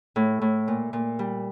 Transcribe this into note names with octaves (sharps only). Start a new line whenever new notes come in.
A2
A2
A#2
A#2
G3